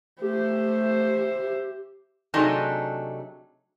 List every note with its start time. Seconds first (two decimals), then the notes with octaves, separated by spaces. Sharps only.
0.22 A3 G4 C5 E5
2.34 C3 F#3 A3 D4 D#4 G#4